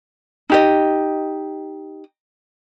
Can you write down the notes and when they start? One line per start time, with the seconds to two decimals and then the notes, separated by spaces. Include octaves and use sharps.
0.50 D#4 G4 D#5